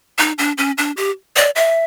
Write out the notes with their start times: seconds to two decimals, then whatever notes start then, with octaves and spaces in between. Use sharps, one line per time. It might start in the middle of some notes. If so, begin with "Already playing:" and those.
0.19 D#4
0.38 D4
0.58 C#4
0.78 D4
0.97 G4
1.36 D5
1.56 E5